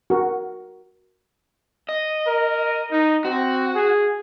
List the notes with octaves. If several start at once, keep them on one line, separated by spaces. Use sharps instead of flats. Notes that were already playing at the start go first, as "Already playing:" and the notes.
F#4 A#4
D#5
A#4
D#4
C4 F#4
G#4